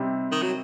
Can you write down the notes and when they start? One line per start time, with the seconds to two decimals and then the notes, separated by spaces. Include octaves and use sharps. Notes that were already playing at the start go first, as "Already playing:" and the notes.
Already playing: C3 G3 C4 D#4
0.32 D#3
0.42 F#3